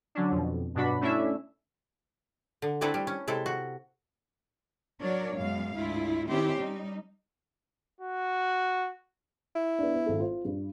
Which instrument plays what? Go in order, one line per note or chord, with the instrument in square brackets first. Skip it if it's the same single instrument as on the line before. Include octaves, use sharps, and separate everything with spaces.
[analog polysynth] D3 F#3 C#4 D4
F2 B2
G2 B2 F#3 D4 F#4 B5
A3 C#4 D4 E4 E5
[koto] D3
A3 C4 D4 E4 A4 B4
G3
C#4
C3 G#3 E4 A4
F#4
[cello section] F#3 D4 A#4 C#5 D5
F#2 B2 G#3 F5
D2 G#2 E4 F4
D#3 C4 C#4 E4 G4 C5
G3 D#4
[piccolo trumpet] F#4
[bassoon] E4
[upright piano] B3 D4
B3
G#1 A4
F4 C5
G2